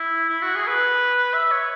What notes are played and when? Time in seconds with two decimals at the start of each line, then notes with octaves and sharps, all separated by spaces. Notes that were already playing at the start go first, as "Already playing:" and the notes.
Already playing: E4
0.29 E4
0.42 F#4
0.56 G#4
0.67 B4
1.33 E5
1.51 C#5